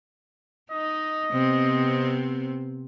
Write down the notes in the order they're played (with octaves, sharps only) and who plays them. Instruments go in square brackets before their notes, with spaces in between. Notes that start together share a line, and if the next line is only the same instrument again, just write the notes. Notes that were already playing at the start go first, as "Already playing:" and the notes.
[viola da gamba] D#4 [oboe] D#5
[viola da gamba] C3 B3 C4